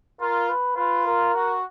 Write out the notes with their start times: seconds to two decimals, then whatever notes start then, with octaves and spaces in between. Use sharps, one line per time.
0.20 F4 A#4
0.49 B4
0.77 F4 B4
1.06 A#4
1.35 F#4